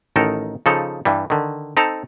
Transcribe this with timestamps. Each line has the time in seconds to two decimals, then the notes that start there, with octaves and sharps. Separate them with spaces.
0.16 A1 D#3 D#4 A4 A#4
0.66 C#3 F3 D#4 A4
1.05 G2 E3 G3
1.30 D3 D#3
1.77 C4 D#4 A4 A5 A#5